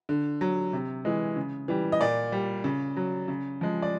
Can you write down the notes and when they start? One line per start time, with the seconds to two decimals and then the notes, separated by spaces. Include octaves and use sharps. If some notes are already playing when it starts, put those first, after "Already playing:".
0.09 D3
0.41 F#3
0.73 C3
1.05 E3 G#3
1.36 C#3
1.68 E3 G3
1.92 D#5
2.01 A#2 D5
2.32 G3
2.64 C#3
2.97 F#3
3.28 C#3
3.61 F3 G#3
3.82 D5